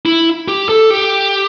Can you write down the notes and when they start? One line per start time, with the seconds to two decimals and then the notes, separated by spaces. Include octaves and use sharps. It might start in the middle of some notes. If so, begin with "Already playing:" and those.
0.06 E4
0.48 G4
0.69 A4
0.90 G4